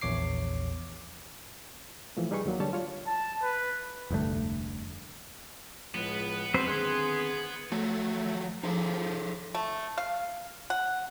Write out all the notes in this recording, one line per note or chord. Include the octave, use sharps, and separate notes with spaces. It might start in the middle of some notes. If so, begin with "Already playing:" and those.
A#1 E2 C#5 D6 C7
E3 F3 A3
G3 D#4 G#4 B4 C#6
D#2 D#3 F#3 A#3
D3 G3 C#5 A5
F4 C#5
A5
B4
F1 D2 G2 A3
C#2 A2 F3 G#3 B3 B4
F#3 C4 B4 C5
D3 D#3 C4 G#4 B4 C6
F3 F#3 A3 F#4
F3 D#4 G#4 A4
A3
F5
F#5